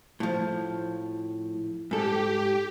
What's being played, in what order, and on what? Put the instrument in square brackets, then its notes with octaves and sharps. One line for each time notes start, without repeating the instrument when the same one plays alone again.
[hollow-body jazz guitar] A2 F3
[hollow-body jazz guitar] G#2 A4 [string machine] G4